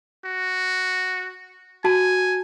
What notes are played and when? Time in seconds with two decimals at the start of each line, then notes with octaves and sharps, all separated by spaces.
0.25 F#4
1.84 F#4 G#5 A5